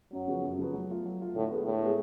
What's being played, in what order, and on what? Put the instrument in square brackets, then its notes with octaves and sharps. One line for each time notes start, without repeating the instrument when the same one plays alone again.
[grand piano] F#2 [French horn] F#3
[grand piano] C#3 F3 B3 F#4
F#2
C#3 F3 B3 F#4
F#3
A3 F4
F#3
A3 F4
[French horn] A2 [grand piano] D3
[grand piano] G#3 B3
[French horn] A2 [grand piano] D3
[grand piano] G#3 B3